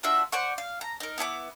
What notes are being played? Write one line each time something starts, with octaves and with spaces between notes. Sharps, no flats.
D4 F4 F#4 E5
C5 D5 F#5 C#6
F5
A#5
D#4 A#4
B3 E4 G#5 D6